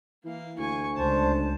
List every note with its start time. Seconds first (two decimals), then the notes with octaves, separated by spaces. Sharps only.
0.25 E3 A#3 F5
0.59 D2 G#5 C#6
0.97 C#2 D4 C5 A5